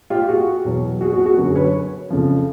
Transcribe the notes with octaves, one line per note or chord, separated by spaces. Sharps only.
F4 G4
F#4 G#4
E2 B2 F#3
F#4 G#4
F#4 G#4
F#4 G#4
F#2 D3 F#3
B4 C#5
F2 C#3 F3